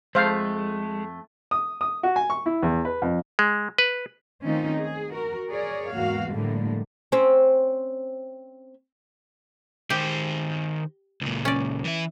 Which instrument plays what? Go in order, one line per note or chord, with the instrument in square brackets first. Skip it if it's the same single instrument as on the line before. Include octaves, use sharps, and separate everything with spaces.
[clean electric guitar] F2 A3 [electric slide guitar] G#3 [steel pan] C5 F5
[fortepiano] D#6
D#6
F#4
G#5
C#6
E4
E2
B4
F2
[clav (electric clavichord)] G#3
B4
[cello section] D#3 A3 C4 C#4 D#4 F4
G#4
F#4 A#4
G#4 A#4 C#5 D5
E2 G#2 A#3 F#4 F5
A2 D3 F3 G3 G#3 A#3
[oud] C4 C#4
[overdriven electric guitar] D#3 C5 [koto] G4
[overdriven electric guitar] C#2 A#2
[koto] C#4 D5
[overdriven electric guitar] E3 E5